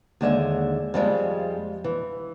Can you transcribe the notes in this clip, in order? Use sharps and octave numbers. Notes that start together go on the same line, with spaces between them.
D#2 D3 G#3 E5
F2 G3 G#3 F4
E3